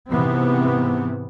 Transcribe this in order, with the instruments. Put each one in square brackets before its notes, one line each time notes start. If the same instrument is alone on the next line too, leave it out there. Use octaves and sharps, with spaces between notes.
[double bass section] G#2 C3 E3 B3 C4